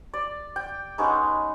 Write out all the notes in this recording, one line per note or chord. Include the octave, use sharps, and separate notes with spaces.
D5
G5
G#3 B3 C#4 D#4